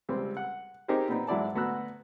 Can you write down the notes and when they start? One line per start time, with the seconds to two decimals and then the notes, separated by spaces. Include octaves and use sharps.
0.09 C#2 G3 C4
0.37 F#5
0.88 C4 D#4 G4 G#4 A#4 C5
1.08 A#2 B3 C4 D#4
1.27 G#2 F#3 E4 D5 A5
1.55 D2 B3 F#4 A#5 E6 F#6